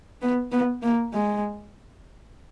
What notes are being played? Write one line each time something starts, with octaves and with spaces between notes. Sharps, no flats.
B3
B3
A#3
G#3